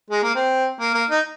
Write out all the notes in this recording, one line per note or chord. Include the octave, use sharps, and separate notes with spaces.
G#3
A#3
C4
A#3
A#3
D#4